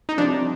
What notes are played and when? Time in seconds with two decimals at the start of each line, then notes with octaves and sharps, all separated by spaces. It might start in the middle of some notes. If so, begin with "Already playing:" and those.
0.09 D#4
0.18 C2 C3 F3 D4